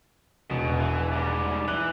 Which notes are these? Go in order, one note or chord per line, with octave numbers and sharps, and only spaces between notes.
E1 B2
E3
G#2 G3
E3 F#6